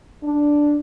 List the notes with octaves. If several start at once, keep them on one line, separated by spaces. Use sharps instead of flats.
D4